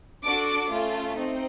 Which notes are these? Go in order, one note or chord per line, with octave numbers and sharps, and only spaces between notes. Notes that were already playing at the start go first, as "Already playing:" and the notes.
D4 F#4 A4 D6
A3 C#4 F4
C4 D#4